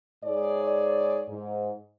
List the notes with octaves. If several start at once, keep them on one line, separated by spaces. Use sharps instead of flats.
G#2 G#4 C#5 D5
G#2